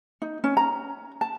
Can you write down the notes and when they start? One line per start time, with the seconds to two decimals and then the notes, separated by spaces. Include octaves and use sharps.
0.22 D#4
0.44 C#4
0.57 A#5
1.21 A5